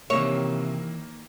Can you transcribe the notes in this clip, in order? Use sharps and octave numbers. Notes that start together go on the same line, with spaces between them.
C3 D#3 E3 A#3 A#4 C#5 E5